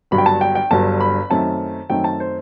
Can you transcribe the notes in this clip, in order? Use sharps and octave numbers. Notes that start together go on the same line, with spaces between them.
G1 G2 F#3 B5
G5
A5
G5
G5
G1 G2 F#3 A5
B5
F#2 D#3 A3 C4 A5
F#2 D#3 A3 C4 G5
A5
C5